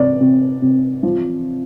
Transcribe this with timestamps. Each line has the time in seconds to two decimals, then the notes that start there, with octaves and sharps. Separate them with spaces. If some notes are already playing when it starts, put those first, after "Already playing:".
Already playing: C3 D5
0.21 C3
0.62 C3
1.03 F3